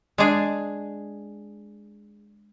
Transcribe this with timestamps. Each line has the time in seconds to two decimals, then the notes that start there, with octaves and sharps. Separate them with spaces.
0.18 G#3 D4 G#4